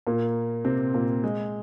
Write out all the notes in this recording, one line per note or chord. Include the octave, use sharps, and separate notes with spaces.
A#2 A#3
C3 C4
A#2 A#3
G#3